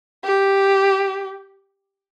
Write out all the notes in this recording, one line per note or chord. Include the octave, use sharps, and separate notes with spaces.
G4